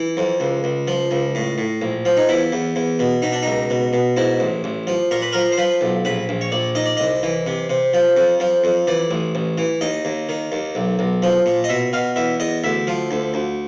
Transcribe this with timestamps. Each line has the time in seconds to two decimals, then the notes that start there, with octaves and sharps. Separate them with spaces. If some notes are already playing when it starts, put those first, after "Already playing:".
Already playing: E3
0.17 F2
0.40 C#2
0.64 C#2
0.88 F3
1.11 C#2
1.35 A2
1.58 A2
1.82 A#1
2.05 F3
2.17 D#4
2.29 E2 E4
2.52 E2
2.76 E2
2.99 B2
3.22 B2 D#4
3.32 D4
3.43 C#2 D#4
3.70 B2
3.93 B2
4.16 G#2 E4
4.40 A1
4.64 A1
4.87 F3
5.11 A#2 A#4
5.22 B4
5.33 F3 A#4
5.52 C5
5.58 F3 B4
5.81 B1
6.05 A#1 B4
6.29 A#1
6.41 C#5
6.52 A#1 D5
6.75 D#3 D#5
6.86 D5
6.97 C2 D#5
7.23 E3
7.47 C3
7.69 C3
7.93 F3
8.17 F2
8.40 F3
8.64 F2
8.87 E3 D5
9.11 A1
9.35 A1
9.58 E3
9.81 D#2 D#5
10.05 D#2
10.29 D#3
10.52 D#2
10.75 B1
10.99 B1
11.22 F3
11.46 A#2
11.64 D#5
11.69 B2 E5
11.93 B2 F5
12.16 E2 E5
12.40 E2 D#5
12.64 D2 E5
12.87 F3
13.11 D2
13.34 D2